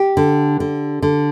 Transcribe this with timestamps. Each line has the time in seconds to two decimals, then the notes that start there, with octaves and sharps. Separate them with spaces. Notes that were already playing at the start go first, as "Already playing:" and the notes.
Already playing: G4
0.17 D3
0.60 D3
1.02 D3